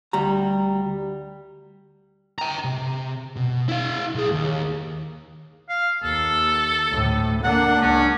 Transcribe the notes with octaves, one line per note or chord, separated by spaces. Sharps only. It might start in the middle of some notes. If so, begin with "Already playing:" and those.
D2 G3 A#5
G5 A#5
C3
B2
E4 F5
B1 G#4
D#2
F5
D#2 A4
D2 A2
A#3 D4 F#5
C#2 C#4